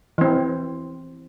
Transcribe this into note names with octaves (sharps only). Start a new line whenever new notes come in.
E3 C4